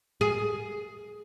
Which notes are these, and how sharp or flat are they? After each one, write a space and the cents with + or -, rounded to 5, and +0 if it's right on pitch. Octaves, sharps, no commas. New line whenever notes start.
G#4 +5